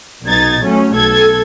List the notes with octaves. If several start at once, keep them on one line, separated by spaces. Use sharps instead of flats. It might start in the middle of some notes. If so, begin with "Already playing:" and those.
B1 B2 D#4 G#6 A6
F#3 A3 C#4
B1 A4 G#6